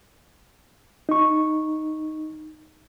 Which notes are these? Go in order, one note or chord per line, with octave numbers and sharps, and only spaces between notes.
D#4 C#6